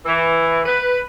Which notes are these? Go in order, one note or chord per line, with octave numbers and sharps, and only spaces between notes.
E3
B4